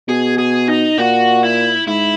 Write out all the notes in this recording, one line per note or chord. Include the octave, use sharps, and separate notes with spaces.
B2 G#4
G#4
D#4
A#2 F#4
E4
G#2 E4